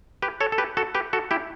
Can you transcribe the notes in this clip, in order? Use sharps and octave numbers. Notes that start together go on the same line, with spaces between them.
G4 B4
A4 C#5
A4
G4 B4
F#4 A4
G4 B4
F#4 A4
E4 G4